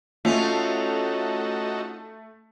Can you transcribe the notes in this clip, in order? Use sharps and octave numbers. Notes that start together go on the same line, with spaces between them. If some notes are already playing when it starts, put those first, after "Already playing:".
A3 C#4 D#4 F4 F#4 A4